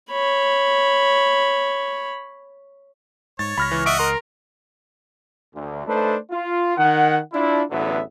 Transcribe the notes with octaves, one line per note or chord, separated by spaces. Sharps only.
C#5 B5
G#2 C#5 A6
C#2 B5 F6 A#6
E3
D#5 E5 F#5 C#6 D7
A#4 C6
D2
A3 D4 D#4 A4 B4 C5
F4
D#3 F#5
D4 E4 F4
A1 E2 D3 F#3 B3 E5